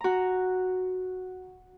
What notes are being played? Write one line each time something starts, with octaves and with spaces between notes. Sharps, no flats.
F#4 A#5